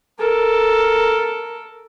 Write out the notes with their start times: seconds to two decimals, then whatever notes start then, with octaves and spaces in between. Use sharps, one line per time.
0.19 A4 A#4